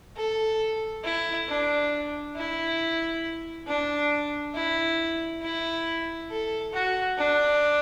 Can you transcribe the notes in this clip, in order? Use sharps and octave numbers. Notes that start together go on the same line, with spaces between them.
A4
E4
D4
E4
D4
E4
E4
A4
F#4
D4